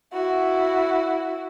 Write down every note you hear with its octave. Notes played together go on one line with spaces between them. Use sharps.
E4 F#4